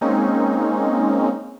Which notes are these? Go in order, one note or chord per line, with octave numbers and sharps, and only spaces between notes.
G#3 A#3 C4 C#4 D#4